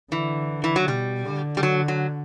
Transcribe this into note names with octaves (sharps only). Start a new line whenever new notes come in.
D3 E3
E3
F#3
B2 G3
D3
G3
F#3
F#3